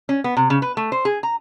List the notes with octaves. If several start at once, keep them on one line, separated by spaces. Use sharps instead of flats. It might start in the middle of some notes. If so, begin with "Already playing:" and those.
C#4
B3
C3
C#3
B4
A3
C5
G#4
A#5